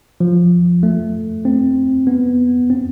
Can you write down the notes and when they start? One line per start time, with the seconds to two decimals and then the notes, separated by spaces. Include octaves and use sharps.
0.20 F3
0.83 A3
1.45 C4
2.07 B3
2.70 C4